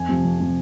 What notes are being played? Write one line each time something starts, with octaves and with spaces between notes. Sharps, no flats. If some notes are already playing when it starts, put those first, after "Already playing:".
Already playing: F2 G#5
C3 F3
F2
C3 F3